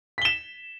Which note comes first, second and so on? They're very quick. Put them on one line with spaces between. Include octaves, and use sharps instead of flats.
B6 G7 E7